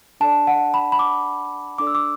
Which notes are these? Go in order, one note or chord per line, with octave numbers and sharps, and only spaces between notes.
D4 A4 D5 A5
F#5
B5
B5
D6
D4 A4 D5 D6
E6
D6